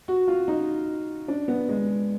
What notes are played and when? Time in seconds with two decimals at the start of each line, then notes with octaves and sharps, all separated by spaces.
0.08 F#4
0.28 F4
0.48 D#4
1.28 D4
1.48 B3
1.69 G#3